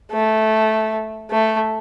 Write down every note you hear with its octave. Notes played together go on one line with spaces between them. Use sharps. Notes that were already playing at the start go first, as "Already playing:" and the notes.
A3
A3